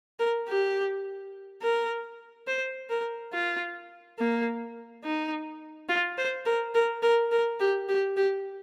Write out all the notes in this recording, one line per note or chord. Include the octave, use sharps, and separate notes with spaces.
A#4
G4
A#4
C5
A#4
F4
A#3
D#4
F4
C5
A#4
A#4
A#4
A#4
G4
G4
G4